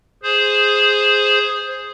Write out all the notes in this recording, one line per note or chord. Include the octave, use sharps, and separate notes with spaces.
G#4 C5